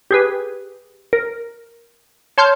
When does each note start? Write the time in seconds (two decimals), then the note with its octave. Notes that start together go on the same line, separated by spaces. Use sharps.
0.11 G4 G#4 B4
1.13 A#4
2.38 C#5 A5 C6 F6 G6